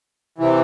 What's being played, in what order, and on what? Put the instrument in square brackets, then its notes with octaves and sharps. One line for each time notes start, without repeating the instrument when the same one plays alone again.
[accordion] C3 E3